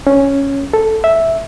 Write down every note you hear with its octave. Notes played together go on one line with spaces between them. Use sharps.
C#4
A4
E5